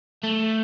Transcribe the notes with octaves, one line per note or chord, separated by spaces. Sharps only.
A3